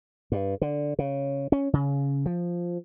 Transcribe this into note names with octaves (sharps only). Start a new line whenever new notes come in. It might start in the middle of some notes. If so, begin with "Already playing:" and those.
G2
D3
C#3
C#4
C#3
F3